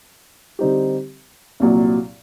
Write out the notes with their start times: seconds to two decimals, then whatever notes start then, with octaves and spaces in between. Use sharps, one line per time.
0.59 D3 G3 C4 D#4 G4
1.60 C2 A#2 F#3